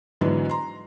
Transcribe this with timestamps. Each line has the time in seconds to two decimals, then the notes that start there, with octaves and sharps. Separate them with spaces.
0.21 G#2 D3 E3 F#3 B3
0.49 A#5 C6